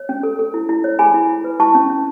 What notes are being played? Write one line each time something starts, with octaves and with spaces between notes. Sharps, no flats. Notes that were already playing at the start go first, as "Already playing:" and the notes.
Already playing: C#5
C#4
A4
A4
E4
E4
C#5
G#4 G#5 B5
E4
E4
B4
E4 A5 C#6
C#4
C#4